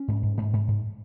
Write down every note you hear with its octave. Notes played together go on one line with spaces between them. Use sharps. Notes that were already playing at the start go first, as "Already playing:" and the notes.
Already playing: C#4
G#2
G#2
G#2
G#2
G#2